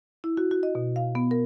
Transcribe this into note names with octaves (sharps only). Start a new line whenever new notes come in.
E4
F#4
F#4
D#5
B2
F5
B3
A#4